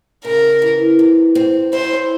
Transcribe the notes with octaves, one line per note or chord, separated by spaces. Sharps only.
C#3 A#4
E3
C3
C4
E4 C5